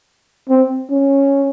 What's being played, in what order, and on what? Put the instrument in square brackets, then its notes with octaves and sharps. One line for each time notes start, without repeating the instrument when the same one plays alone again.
[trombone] C4
C#4